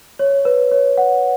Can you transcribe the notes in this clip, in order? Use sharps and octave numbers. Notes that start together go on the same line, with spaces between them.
C#5
B4
C#5
F#5